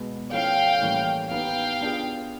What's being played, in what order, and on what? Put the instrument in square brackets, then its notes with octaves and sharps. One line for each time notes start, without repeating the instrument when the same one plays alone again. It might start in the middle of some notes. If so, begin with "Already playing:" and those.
Already playing: [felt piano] B2 G#3 B3
[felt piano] F3 A3 C#4 E4 [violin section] F5 G5
[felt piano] A2 E3 G3 A#3 C#4
[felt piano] B3 D#4 G4 B4 [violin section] F5 G5
[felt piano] B3 D4 F4 G#4